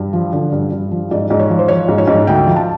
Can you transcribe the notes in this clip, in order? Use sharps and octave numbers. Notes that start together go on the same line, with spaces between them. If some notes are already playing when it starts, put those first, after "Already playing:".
Already playing: G2
F3
D3
G2
G2
F3
G#2 D5
G#2
C#5
F3
C5
F3 C#5
G#2
C#5
G#2
D2 G5
F3
A5